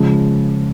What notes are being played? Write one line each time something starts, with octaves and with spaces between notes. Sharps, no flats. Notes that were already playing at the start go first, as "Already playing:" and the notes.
Already playing: C#3 F3 G#3